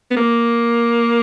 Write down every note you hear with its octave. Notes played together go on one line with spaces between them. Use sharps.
B3
A#3